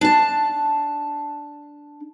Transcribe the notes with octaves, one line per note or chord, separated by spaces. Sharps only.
D4 A5